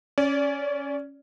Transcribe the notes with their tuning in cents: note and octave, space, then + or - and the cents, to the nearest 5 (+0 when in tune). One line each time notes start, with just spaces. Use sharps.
C#4 +0 D5 -25